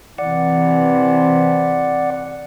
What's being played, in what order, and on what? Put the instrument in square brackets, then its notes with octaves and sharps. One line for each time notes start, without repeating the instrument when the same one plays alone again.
[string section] C3 E3 [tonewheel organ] D5 F#5